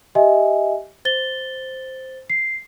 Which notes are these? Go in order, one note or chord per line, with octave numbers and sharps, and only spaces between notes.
G4 D#5 E5 G#5
C5 A6 G7
C7